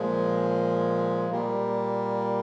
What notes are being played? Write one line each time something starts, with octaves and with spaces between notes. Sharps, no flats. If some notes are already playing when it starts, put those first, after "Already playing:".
Already playing: A#2 F3 G#3
A#2 G3 A#3